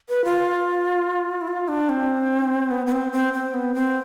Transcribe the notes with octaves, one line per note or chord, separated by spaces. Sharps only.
B4
F4
E4
F4
D4
C4
B3
B3
C4
C4
C4
B3
C4